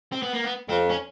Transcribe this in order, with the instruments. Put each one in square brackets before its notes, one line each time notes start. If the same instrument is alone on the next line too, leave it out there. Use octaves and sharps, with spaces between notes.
[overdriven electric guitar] C4
B3
A#3
B3
[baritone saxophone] F2 [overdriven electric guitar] C4
[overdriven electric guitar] C#4